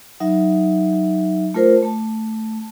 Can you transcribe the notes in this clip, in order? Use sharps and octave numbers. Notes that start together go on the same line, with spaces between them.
F#3 D#4 E5
A3 F4 A#4 C5
A3 A5